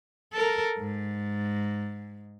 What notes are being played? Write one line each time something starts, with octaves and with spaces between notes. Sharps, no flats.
A4 A#4
G#2